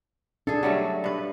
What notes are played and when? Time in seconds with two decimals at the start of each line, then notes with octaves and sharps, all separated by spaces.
0.47 D4 G#4 A4
0.63 F#3 G3 A3
1.04 G2 B4